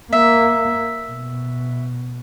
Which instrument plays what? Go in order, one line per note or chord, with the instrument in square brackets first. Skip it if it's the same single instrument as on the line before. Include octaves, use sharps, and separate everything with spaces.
[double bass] A#3 [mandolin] E5
[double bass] B2